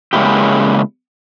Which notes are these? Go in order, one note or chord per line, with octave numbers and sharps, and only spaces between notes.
C#3 G#3 A#3 B3 E4 G4